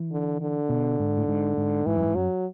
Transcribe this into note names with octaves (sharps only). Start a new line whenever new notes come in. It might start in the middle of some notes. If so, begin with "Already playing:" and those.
Already playing: E3
D3
D3
B2
G#2
A2
G#2
G#2
G#2 E3
F#2
G#2
F#2 F#3